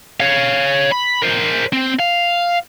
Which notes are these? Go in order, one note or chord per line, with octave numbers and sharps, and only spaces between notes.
C#5 F5
B5
A#4 C5
C4
F5